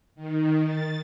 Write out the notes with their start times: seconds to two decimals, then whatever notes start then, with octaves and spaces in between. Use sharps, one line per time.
0.15 D#3
0.66 A6